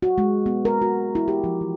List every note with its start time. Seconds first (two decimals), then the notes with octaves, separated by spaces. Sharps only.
0.02 F#4
0.18 G#3
0.46 B3
0.65 A#4
0.82 F#4
1.15 E4
1.28 G4
1.44 F3
1.61 E3